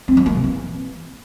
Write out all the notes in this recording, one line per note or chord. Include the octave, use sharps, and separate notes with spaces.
C4
F3
A#3
C3
E3